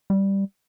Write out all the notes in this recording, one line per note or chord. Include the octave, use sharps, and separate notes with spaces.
G3